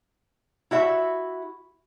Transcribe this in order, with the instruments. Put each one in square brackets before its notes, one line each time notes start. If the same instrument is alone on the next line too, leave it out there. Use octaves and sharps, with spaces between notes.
[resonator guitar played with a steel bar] E4 F#4 E5